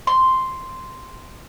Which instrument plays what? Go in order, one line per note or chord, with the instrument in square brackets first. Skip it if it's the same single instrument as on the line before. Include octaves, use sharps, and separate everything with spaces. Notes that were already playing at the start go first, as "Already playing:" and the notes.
[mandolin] C6